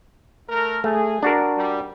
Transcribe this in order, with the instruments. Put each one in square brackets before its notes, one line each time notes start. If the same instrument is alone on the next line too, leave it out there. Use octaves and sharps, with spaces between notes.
[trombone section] A3 A#4
[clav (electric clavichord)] A3 [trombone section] G#4
[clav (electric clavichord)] D4 F#4 A#4
[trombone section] G3